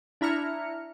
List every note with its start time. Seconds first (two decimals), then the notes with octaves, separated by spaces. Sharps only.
0.21 D4 E4 A#5 F6 C#7